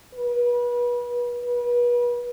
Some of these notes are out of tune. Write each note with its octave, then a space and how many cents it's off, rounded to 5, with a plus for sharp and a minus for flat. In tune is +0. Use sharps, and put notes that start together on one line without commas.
B4 -30
B4 -35